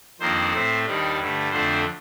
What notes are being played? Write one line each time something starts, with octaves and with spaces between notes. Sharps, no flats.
F2 D#3 A#3 D4 C5
A2 A3 C4
D#2 D#3 G3 D4
G2 D3 A3
F2 D3 A3 D4 C5